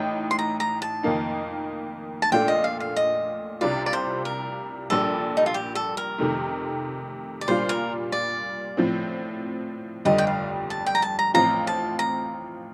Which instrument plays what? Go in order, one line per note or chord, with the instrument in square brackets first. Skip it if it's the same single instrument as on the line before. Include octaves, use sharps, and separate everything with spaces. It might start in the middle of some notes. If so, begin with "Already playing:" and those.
Already playing: [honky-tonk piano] A1 A2 D#4 [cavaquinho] G5
[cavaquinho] C6
A#5
A#5
A5
[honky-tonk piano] F2 D#3 A#3 D#4
[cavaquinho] A5
[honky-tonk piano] A#1 A#2 A3 D4 F4 [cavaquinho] G5
[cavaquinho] D#5
F5
F5
D#5
[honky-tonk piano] C2 C3 G3 D4 F4 [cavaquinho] D5
[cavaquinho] D5
C5
A#4
[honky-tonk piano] A#1 A#2 G3 D4 [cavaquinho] A4
[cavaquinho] D#4
F4
G4
A4
A#4
[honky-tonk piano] F2 C3 D#3 A3
[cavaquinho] D5
[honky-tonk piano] A#2 G3 D4 F4 [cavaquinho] C5
[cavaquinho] A#4
D5
[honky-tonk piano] A2 F3 C4
[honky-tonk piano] G1 F2 D3 G3 [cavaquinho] D#5
[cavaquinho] G5
F5
A5
G5
A#5
A5
A#5
[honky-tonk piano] A1 A2 F3 C4 F4 [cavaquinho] A#5
[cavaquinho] A5
A#5